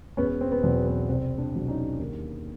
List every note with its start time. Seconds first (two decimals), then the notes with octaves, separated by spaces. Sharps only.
0.17 E1 B3 C#4
0.41 C4
0.52 B3
0.63 E2 B2 F#3 C4
0.86 B3
1.08 C2 C4
1.38 C4 D4
1.54 B2 F#3
1.68 C#4 D#4
1.99 D#2